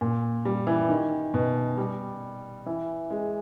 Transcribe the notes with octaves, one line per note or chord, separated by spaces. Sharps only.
A#2
G3
E3
D#3
B2
G3
E3
G#3